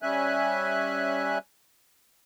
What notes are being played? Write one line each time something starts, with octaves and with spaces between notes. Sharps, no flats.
G3 C#4 E5 G#5 F#6